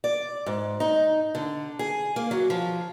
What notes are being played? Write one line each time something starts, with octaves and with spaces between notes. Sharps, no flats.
D5
G#2
D#4
D3
G#4
A#3
F#3
F3